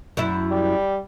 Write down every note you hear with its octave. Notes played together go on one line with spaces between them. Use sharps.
F#2 E4
G3